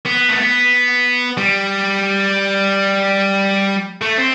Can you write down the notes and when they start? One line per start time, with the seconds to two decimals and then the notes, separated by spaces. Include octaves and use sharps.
0.05 B3
0.29 A3
0.39 B3
1.37 G3
4.02 A3
4.18 C4